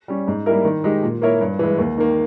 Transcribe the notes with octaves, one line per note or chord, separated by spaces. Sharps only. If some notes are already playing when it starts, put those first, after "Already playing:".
G3 C#4
G#2
G3 A#3 E4 A#4
D#3
G#3 D#4 G4
A#2
A#3 E4 A#4 C#5
G2
E3 G#3
D#2
D#3 A#3